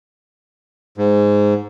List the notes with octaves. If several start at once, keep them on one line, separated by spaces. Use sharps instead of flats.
G#2